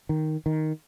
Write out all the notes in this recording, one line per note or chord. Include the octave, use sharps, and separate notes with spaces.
D#3
D#3